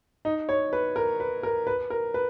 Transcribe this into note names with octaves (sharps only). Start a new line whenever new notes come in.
D#4
C#5
B4
A#4
B4
A#4
B4
A#4
B4